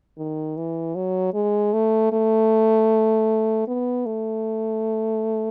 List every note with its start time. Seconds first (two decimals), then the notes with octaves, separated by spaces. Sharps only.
0.17 D#3
0.57 E3
0.95 F#3
1.33 G#3
1.73 A3
2.12 A3
3.68 B3
4.06 A3